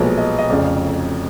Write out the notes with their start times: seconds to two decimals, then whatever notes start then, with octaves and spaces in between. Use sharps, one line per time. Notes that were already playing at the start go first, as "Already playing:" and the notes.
Already playing: B1 A#2 F3 G#3 B3
0.18 D#5
0.39 D#5
0.50 F1 F2 C#3 D5